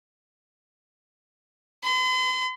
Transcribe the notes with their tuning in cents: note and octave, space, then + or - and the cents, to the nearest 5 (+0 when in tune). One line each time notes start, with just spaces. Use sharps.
C6 -45